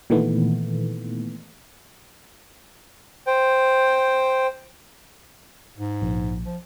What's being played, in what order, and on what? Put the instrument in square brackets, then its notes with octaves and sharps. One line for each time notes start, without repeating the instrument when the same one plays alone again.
[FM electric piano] A#2 D#3 E3 A3 B3
[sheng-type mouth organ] C5 G5
[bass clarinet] G#2
[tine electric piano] A#1
[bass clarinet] F3